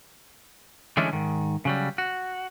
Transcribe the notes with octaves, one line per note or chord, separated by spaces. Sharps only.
D3 E3 G#3 A3 C#4 D4
G#2 D#3
C#3 F#3 G3
F#4